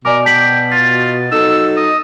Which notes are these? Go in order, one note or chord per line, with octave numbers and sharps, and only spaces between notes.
B2 A#4 D5 G#5 D6
G5 A5 B6 F#7
F4 A6
F#3 D#4 A4 E6
D#5